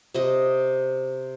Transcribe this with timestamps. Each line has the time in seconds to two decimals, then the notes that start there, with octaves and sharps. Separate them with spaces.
0.14 C3 D#5